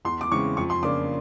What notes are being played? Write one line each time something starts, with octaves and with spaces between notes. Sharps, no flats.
E2 C6
D6
C#3 E3 G#3 C4 C#6
F2 C#6
C6
C#3 F3 A#3 D4 D6